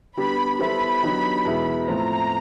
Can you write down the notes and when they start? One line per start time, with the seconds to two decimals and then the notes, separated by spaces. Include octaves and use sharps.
0.17 D3 G3 B3 D4 G4 B5
0.59 G3 B3 E4 A4 C5 B5
1.03 D3 F#3 B3 D#4 G4
1.45 E2 B2 G#3 B3 E4
1.88 A2 F3 A3 C4 F4 A#5